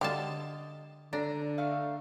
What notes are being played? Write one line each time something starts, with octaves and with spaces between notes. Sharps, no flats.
D3 G4 D#5 F5 A5
D3 D4 A#5
A3 F5